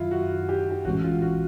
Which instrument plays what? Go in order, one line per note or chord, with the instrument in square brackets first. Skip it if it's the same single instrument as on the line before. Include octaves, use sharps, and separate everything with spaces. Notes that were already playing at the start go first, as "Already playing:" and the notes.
Already playing: [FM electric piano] F#2 D#3 F#3 [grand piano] E4 F4
[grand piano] F#4
G4
G4
[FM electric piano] A#1 A2 E3 G#3 C#4 [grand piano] F#4
[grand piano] F4
F#4